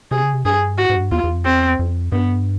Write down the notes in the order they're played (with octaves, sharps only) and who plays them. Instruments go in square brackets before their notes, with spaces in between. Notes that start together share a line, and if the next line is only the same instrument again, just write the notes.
[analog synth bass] C3 [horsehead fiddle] G#4
[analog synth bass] C#3
C3
[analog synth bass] G2 [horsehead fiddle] G#4
[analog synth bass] G#2 [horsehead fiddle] F#4
[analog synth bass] G#2
F#2
G2
[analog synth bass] E2 [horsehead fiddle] F4
[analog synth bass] E2
F2
[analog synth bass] E2 [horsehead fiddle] C4
[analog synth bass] F2
[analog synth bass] G2 [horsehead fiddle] B3